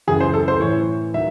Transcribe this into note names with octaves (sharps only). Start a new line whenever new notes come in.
F#2 C#3 E3 G#4
C5
A4
C5
A2 E3 C#5
D#3 F#3 E5